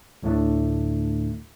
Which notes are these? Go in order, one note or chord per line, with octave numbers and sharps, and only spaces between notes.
D2 A2 D3 A3 D4